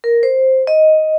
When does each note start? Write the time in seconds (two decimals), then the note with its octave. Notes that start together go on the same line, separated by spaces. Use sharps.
0.04 A#4
0.23 C5
0.67 D#5